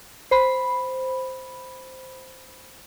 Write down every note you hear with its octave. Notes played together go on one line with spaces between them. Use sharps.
C5 B5